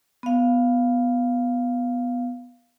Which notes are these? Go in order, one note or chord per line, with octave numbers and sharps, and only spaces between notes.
B3 F5